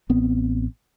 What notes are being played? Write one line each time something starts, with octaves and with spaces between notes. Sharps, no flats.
A1 B3 C4